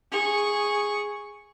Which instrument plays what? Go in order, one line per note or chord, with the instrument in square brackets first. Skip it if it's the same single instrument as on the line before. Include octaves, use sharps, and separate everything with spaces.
[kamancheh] G#4 C#6